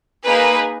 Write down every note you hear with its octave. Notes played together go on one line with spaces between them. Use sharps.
A#3 D#4 G#4 B4